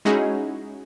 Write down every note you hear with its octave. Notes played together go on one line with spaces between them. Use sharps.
G#3 C#4 D#4 E4 F#4 G#4